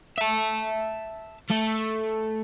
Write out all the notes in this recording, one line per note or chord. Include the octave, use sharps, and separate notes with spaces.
E5 A5
A3 A4